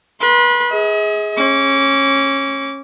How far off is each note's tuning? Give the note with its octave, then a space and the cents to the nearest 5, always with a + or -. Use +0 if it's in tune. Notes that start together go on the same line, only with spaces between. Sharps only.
B4 -30 C6 +5
G#4 +0 D#5 +45
C#4 -20 D6 -35